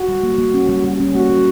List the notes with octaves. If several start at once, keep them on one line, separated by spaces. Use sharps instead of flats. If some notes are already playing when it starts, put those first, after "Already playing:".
Already playing: F#4
G3
A#3
A#3
C#4
G3
G3
C#4
A#3 F#4
G3